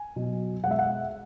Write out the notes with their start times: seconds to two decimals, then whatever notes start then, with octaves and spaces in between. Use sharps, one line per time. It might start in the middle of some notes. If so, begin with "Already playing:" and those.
Already playing: G#5
0.16 B2 F#3
0.63 B2 F#5
0.67 G#3 E5
0.79 F#5